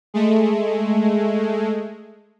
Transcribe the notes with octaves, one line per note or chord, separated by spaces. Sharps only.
G#3 A3